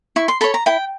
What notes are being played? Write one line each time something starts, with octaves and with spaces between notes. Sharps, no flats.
E4 C#6
C6
A4 C#5 B5
A#5
E4 G5